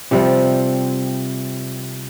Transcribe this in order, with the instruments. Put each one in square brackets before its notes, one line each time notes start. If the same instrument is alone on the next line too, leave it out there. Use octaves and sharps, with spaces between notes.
[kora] C3 F3 G3 C4